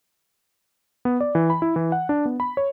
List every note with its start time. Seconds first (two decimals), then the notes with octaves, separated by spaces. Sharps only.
1.05 B3
1.21 D5
1.35 E3
1.50 B5
1.62 E4
1.76 E3
1.92 F#5
2.09 D4
2.25 B3
2.40 B5
2.57 C#5